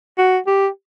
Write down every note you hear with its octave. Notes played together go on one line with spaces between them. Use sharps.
F#4
G4